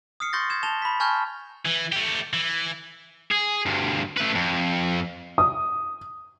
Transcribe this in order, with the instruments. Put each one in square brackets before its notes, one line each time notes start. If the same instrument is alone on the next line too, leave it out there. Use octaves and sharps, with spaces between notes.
[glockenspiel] D#6 F6 C7 C#7
C6 C#6 G6 A6 A#6
G#6 E7
A5 E7 F7 G7
B5 B6
G#5 A5 C#6 F6 G6 G#6
[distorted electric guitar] E3
A3 G4
E3
G#4
D2 G2
A3 B4
F2
[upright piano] D#6